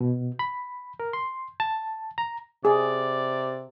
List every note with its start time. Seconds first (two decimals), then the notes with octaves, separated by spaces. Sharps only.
0.01 B2
0.39 B5
1.00 A#4
1.13 C6
1.60 A5
2.18 A#5
2.65 C3 G#4 D5